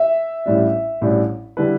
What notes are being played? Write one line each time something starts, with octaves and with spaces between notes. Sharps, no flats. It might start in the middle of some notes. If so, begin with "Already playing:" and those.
Already playing: E5
A1 A2 G3 D4
A1 A2 G3 D4
D3 G3 E4 B4